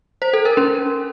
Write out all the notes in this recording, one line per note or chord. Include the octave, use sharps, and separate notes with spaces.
C5
A4
A#4
C#4